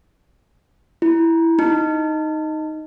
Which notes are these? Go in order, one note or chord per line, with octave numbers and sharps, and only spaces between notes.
E4
D#4